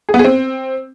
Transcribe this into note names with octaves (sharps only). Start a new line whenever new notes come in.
G#4
B3
G#4
C4